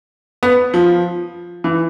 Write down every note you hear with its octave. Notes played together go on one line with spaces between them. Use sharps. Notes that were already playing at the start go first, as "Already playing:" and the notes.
B3
F3
E3